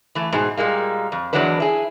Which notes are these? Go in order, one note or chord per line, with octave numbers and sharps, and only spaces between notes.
E3 A3
G#2 B2 G#4
A#2 G3 G#3 A#3
F2
E2 F3 F#3 G#3 D4 B4
E4 G#4